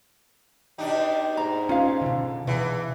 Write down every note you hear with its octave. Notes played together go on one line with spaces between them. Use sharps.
B2 D4 D#4 G4
G#2 A#5
C#4 F4 F5
B2 D3
E2 B2 E3